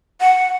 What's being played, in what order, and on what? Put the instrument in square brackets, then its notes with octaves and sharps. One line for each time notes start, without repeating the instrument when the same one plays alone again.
[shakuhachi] F#5